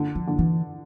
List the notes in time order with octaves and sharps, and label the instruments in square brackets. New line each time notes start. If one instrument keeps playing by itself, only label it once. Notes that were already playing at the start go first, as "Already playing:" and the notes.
Already playing: [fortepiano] D3
[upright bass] F3
[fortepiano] D3
[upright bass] E3